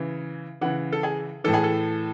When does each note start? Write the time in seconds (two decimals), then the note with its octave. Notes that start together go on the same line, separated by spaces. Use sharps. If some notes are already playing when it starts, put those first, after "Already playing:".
Already playing: C#3 E3
0.61 C#3 E3 F#5
0.92 A4
1.03 G#4
1.44 A2 E3 A4
1.54 G#4
1.64 A4